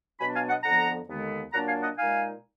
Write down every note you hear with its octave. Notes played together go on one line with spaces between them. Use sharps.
B2 F#3 B3 D4 G#5 B5
F5 G#5
D#5 F#5
F2 D3 F3 B3 F#5 A#5
D#2 D3 G#3 B3
A#2 F#3 A#3 D4 F#5 A#5
F5 G#5
D#5 F#5
A#2 G#3 D#4 F5 G#5